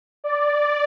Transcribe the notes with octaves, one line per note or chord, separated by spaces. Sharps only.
D5